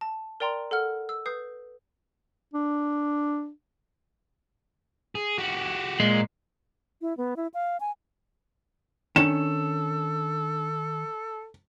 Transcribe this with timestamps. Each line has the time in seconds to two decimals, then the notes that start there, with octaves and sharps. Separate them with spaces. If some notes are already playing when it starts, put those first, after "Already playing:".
0.01 A5
0.40 A#4 D5 G5 A#5 C6
0.71 A4 F#5 F6
1.09 E6
1.26 B4 D#6 G6 C7
2.53 D4
5.15 G#4
5.38 F#4 G4
6.00 A#2 G#3
7.01 E4
7.17 B3
7.36 E4
7.54 F5
7.80 G#5
9.16 D#3 C#4 D4 A4 E7